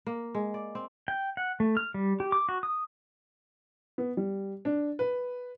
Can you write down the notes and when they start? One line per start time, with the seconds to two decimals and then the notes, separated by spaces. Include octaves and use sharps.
0.07 A#3
0.35 G#3
0.54 D5
0.75 C4
1.08 G5
1.37 F#5
1.60 A3
1.77 F6
1.94 G3
2.20 G4
2.32 D6
2.49 F#4
2.63 D#6
3.98 B3
4.17 G3
4.65 D4
4.99 B4